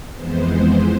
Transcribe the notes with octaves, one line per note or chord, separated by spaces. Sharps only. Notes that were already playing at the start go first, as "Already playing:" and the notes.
F2 E3 G#3 B3 C5